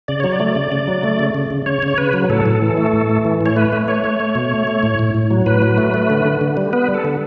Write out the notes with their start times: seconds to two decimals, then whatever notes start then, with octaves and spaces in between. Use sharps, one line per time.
0.08 C#3 D5
0.20 F#3 C#5
0.32 D5
0.40 A3
0.55 C#3
0.72 C#3
0.87 F#3
1.03 A3
1.19 C#3
1.34 C#3
1.50 C#3
1.66 C#3 C#5
1.83 C#3
1.88 C#5
1.98 C#3 B4
2.13 F#3
2.30 A2 A4
2.46 A2
2.62 E3
2.77 A3
2.93 A2
3.09 A3
3.25 E3
3.41 A2
3.46 C#5
3.56 A3 B4
3.72 A3
3.88 A3 C#5
4.04 A3
4.20 A3
4.35 B2
4.51 A3
4.67 A3
4.83 A2
4.99 A2
5.14 A2
5.30 F#3
5.46 A2 B4
5.62 F#3
5.78 A3
5.94 A3
6.10 D3
6.25 D3
6.41 D3
6.57 G3
6.73 B3 B4
6.89 G3
6.94 A4
7.05 D3